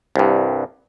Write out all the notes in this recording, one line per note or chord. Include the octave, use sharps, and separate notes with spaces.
C2 G2